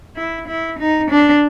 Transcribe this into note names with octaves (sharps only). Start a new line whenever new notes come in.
E4
E4
D#4
D4